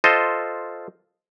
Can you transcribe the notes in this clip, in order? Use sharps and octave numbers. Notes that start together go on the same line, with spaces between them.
F4 A4 C5 D#5